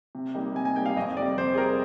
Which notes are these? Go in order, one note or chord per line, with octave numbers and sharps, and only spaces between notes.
C3
G3 A#3 D#4
C3 G#5
G#5
G3 A#3 D#4 G5
F5
F2 D#5
C3 G3 D5
F2 C5
G#4
C3 G3 A#4